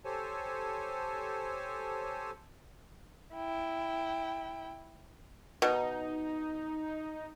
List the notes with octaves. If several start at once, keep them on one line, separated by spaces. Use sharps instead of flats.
G4 A4 C5 C#5 G#5 A5
E4 G5
B2 D#4